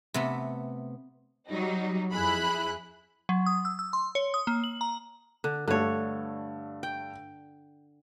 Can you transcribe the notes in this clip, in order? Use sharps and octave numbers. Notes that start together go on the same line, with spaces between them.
C3 A3 B3
F#3 G3 D#4
F2 E4 G#4 B5 F#6
F#3
D#6
E6
E6
C6
C#5
D#6
A#3
F#7
A#5
D3
G2 D3 A3 C#5
G5